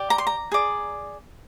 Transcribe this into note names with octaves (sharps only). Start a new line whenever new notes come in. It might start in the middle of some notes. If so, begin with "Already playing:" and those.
Already playing: G4 D5
A#5
C6
A#5
G#4 D5